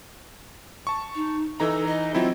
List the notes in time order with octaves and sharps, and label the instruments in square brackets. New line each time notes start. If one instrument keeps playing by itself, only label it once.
[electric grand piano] A5 C#6
[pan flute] D#4
[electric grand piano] E3 D#4 A#5 [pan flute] A4
[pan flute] D#5
[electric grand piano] F#3 C4 E4 [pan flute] F4